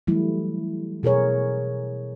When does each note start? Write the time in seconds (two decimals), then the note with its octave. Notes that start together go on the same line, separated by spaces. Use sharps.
0.07 E3 F#3 G3 A3 E4
1.03 B2 G#4 A#4 C#5